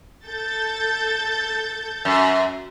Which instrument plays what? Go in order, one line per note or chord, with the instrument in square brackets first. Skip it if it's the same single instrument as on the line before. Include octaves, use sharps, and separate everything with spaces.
[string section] A4 G6 A6
[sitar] F#2